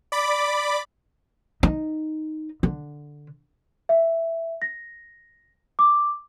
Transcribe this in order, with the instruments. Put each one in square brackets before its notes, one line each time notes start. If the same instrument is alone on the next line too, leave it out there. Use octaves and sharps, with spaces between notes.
[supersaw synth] D5 B5 D6
[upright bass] D#4
D3
[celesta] E5
A#6
D6